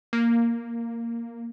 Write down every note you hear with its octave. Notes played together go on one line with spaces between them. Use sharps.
A#3